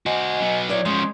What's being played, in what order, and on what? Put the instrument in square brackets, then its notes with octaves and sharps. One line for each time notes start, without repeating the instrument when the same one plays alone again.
[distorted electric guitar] F#4 C5 [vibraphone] D#5 G#5
[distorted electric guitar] F#3 B3
[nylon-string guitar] E4 C#5 D5
[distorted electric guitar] F3 C#4 [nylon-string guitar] G#3 [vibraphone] C6